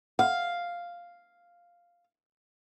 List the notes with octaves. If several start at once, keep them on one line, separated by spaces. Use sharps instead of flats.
F5 F#5